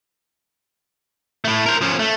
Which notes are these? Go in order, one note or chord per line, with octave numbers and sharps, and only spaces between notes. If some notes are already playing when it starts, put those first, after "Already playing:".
A2 A3
A#4 C5
F3 C#4
A3